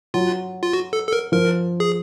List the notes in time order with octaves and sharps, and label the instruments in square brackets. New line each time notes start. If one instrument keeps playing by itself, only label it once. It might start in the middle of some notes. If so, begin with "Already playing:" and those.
[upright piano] F#3 [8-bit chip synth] F4
[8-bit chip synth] F4
F#4
A4
A4
A#4
[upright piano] F3 [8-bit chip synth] A#4
[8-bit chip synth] G#4